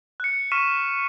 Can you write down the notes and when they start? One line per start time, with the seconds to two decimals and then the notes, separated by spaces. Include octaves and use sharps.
0.20 F#6 C#7
0.52 C#6 F6 B6 D#7 E7